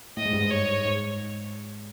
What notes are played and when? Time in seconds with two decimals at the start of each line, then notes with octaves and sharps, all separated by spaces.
0.17 A2 D#5
0.25 G#2
0.33 G2
0.41 G#2
0.50 C#5
0.85 G#2